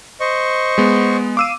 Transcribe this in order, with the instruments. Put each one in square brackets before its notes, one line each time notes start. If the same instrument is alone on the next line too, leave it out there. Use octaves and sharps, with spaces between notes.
[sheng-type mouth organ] C5 D#5 C#6
[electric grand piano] G#3 B3
[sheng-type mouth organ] F5 [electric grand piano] D6 E6 D#7